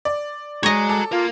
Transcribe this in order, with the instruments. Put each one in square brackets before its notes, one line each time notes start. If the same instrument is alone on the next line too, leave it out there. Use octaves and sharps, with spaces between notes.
[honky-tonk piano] D5
[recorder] G#3 [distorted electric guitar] F#4 A#5 [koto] C#5 D#5
[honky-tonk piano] A4 D6
[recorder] F4 [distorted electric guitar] A#4 F5